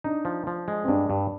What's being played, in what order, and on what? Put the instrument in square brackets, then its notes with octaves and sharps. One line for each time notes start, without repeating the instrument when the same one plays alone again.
[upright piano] D4 [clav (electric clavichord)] D#4
[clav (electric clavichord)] F3
F3
G#3
[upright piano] C4
[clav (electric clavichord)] G2 [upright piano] D4
[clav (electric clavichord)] G2